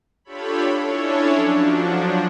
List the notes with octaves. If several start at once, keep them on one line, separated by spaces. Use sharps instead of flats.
D4 F4 G4 A4 C#5 B5
C#4 D4 E4 A4 C#5
F3 F#3 D4